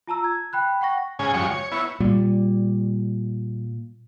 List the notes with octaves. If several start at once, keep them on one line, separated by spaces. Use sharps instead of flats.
F4 A5 A#5 E6
G#6
G5 B5 F#6
F#5 G5 C#6 A#6
G#2 C#3 C#4 G#5
F#2 C#3 F3 G3 G#3 C#6
C#5
B3 E4 C#5
A#2 G3